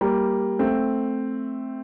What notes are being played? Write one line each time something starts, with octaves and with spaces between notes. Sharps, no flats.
G3 A#3
A3 C4